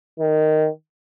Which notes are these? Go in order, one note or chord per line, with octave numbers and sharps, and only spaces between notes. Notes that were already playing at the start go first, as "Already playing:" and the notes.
D#3